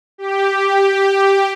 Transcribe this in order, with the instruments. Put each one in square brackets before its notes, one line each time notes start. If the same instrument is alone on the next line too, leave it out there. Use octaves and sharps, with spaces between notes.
[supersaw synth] G4